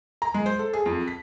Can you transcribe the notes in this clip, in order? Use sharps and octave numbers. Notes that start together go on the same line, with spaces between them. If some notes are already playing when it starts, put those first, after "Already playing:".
A#5
G#3
C5
A4
G#4
F2
B6